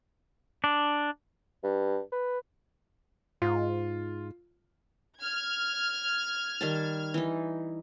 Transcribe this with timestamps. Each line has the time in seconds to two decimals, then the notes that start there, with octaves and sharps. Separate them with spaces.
0.64 D4
1.63 G2
2.12 B4
3.42 G#2 F4
5.20 F6 G#6
6.61 D#3 G3 A5
7.14 E3 D#4